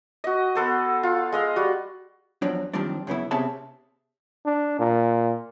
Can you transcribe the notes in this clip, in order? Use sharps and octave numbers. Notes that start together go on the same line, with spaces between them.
F#4 D#5
B3 A4 C5
F4
G#3 D#5 F5
G3 F#4
E2 F3 F#3 D4
F#2 D#3 F3 G3 C4 D4
F#2 C#3 B3 E4
C3 B3 C#4 G#4 E5 A5
D4
A#2